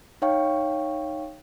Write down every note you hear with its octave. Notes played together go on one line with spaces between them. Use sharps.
D#4 C#5 F5 G5 C#6